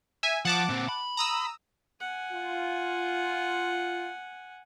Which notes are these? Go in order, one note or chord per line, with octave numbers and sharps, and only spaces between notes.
E5 G#5
F3 F#5 A5 D6
A#2 C4
B5
A#5 D#6 E6
F#5 G#5
F4